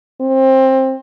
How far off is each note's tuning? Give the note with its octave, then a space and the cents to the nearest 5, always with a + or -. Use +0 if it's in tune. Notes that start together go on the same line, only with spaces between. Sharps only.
C4 +20